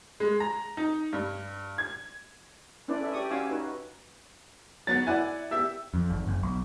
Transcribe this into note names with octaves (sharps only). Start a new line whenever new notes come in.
G#3
A#5
D#4
G2
G#6
C#4 D4 E4 B4 D5
A4 E5
G4 D5 C#6 D#6
C#4 F#4 F5 G#5 D6 E6
D#4 F#4 B4
F#3 B3 F#4 A6
E4 D5 F#5 G#5
G4 E5 E6
F2
G#1
F#1
B1